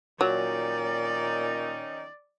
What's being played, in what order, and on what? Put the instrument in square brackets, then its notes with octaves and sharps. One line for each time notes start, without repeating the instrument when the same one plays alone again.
[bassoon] A#2 [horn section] D#3 C#4 D#4 [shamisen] F#3 [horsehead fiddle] D5